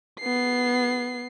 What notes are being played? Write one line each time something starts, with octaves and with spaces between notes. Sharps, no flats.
B3 C7